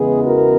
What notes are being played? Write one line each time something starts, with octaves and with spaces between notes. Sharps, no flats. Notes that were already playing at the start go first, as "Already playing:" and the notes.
Already playing: E2 C#3 E3 G#3 B3 G#4
F#4 A#4